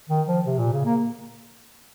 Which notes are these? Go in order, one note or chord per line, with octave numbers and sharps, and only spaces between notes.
D#3
F3
C3
A#2
C#3
A#3